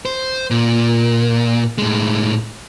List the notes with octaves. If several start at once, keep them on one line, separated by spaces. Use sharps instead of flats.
C5
A#2
A2 G#3